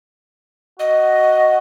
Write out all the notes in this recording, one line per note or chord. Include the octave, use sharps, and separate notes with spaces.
F#4 D#5